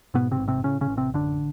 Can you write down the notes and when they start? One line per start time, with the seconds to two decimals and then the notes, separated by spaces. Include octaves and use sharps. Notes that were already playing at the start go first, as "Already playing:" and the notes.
0.14 G#2 B2 B3
0.31 C3 C4
0.39 A1
0.48 C3 C4
0.64 A2 C#3 C#4
0.81 C#3 C#4
0.89 A1
0.97 C3 C4
1.14 F#2 D3 D4